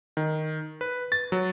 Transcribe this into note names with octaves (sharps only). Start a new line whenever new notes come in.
D#3
B4
A6
F#3